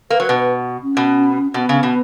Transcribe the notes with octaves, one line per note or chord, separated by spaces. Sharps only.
A#3 B4
F#3
B2 B4
B4
C#4
B2
B2 B3
C#3
B2